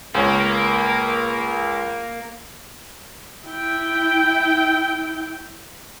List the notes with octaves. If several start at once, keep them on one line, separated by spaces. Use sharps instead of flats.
C#2 A#3 C#5
E4 G5